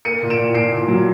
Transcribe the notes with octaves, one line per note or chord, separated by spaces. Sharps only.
A#3 C#7 D#7
A#2
D7 E7
A#2
A#2 C7 D7
A#2
F#3